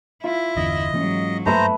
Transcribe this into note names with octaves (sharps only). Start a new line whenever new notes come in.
E4 F4
G1 E2 D3 D#5
G#2 E3 F#3 A#3 C#4
G2 A3 A#3 B4 C5 E5 A#5